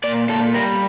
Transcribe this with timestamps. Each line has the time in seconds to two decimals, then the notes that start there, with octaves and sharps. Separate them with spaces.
0.04 A#2 D5
0.29 A#2 A4
0.54 G3 A#4